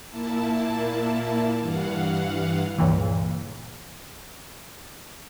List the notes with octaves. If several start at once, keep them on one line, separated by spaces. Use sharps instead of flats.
A#2 A#3 E4 A5
G2 E3 F5 F#5
C#2 G2 A#2 E3